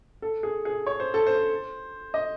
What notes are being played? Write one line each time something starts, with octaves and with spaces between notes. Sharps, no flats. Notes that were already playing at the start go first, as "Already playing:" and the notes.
A4
G#4
G#4
C#5
C5
A4
C5
D#5